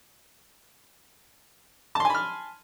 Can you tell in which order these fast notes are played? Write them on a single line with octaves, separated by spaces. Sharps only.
A5 C6 G#5 B5 F6